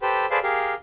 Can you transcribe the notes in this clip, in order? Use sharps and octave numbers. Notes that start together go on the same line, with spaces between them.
G4 A4 B4 C5 G5
G#4 A4 B4 C5 D5 F5
G4 G#4 A#4 F5